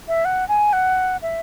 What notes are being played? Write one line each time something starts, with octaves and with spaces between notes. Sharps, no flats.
E5
F#5
G#5
F#5
E5